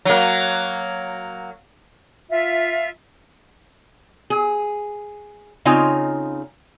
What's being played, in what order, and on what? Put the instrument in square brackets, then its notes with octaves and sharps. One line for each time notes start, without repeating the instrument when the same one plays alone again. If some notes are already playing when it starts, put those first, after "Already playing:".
[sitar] F#3 A#3
[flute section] F4 E5
[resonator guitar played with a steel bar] G#4
C#3 C4 D#4 F4 C#5